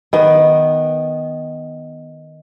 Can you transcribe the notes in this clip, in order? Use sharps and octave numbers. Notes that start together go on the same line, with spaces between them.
D#3 B3